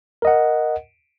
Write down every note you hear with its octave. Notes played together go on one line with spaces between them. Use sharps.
A#4 D#5 F#5